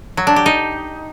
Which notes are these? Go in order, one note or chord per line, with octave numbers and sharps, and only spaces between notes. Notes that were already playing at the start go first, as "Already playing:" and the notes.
F#3
D4
G4
D#4